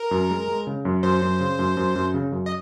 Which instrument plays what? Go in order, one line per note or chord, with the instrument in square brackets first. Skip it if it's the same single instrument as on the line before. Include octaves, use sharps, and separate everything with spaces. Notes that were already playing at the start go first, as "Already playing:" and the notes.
Already playing: [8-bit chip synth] A#4
[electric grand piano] F#2
G#3
G#3
C#3
F#2
[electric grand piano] F#2 [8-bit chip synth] C5
[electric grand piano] F#2
C#3
F#2
F#2
F#2
C#3
F#2
[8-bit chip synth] D#5